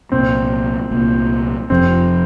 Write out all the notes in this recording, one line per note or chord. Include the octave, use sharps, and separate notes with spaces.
C2 A#2 A#3 C4
C2 A#2 A#3
F1 F2 F3 C4